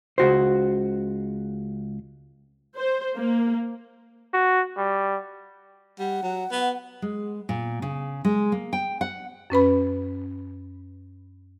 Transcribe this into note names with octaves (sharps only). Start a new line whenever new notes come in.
C#2 F#4 C5
C5
A#3
F#4
G3
G3 F#5
F#3
B3
G#3
A#2
C#3
G#3
A#3
G5
F#5
F#2 C#4 B4 B5